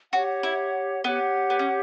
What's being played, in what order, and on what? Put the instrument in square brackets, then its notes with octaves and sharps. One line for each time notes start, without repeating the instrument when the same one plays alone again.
[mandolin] F#4 [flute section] G4 C#5 F#5
[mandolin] E4
[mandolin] B3 [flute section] G4 C#5 F#5
[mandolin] B3
C#4